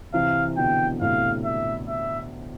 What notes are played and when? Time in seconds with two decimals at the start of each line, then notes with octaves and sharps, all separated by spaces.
0.14 C3 E3 F5
0.57 B2 D3 G5
1.01 A2 C3 F5
1.45 E5
1.89 E5